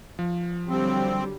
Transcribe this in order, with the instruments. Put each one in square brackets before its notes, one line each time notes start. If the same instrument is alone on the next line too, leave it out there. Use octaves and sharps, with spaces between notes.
[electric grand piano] F3
[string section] D3 F#3 G3 [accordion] C4